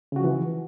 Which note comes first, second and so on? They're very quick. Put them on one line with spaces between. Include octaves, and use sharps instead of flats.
C#3 F#4 F3 E3